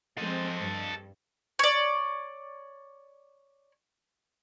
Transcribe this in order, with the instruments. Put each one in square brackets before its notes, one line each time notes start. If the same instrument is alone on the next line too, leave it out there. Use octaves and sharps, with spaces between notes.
[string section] F3 G#3 C4 [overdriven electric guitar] A4 D#5
[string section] G2
[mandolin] C#5 D5